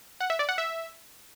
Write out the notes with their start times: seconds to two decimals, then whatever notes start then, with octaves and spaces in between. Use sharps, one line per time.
0.20 F#5
0.30 E5
0.39 D5
0.49 F#5
0.58 E5